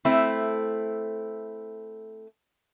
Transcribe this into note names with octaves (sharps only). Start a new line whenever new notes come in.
A3 C4 E4